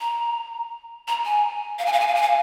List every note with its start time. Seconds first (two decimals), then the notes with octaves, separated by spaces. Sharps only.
0.01 A#5
1.08 A#5
1.25 G#5
1.79 F5
1.86 G#5
1.93 F5
2.00 G#5
2.07 F5
2.15 G#5
2.22 F5